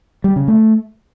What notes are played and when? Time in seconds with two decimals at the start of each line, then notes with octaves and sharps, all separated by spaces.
0.24 G3
0.36 C#3
0.48 A3